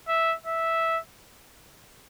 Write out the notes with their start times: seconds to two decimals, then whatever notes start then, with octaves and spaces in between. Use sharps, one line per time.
0.08 E5
0.46 E5